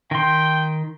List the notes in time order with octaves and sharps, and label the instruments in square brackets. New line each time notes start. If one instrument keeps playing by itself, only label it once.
[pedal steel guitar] D#3 C6 [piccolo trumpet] G5